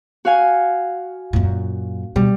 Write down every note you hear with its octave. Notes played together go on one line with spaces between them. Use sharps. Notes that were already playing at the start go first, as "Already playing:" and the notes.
F#4 F5 G#5
F#2 A#2
B2 G3